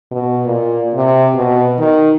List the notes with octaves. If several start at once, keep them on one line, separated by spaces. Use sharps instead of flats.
B2
A#2
C3
B2
D#3